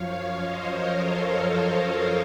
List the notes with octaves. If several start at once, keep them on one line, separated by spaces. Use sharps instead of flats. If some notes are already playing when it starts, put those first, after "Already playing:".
Already playing: F#2 F3 C#5 F5
C5 D#5
A#4 C#5
A4 C5